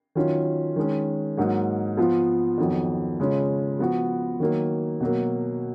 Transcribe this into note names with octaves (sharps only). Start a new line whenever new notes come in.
D#3 F#3 C#4 F4
D#3 G#3 C#4
G#2 F#3 A#3 D#4 F#4
F3 B3 F4
F2 D#3 F#3 B3
C#3 G#3 C#4 F4
F3 B3 F#4
D#3 F#3 A#3
B2 F#3 A#3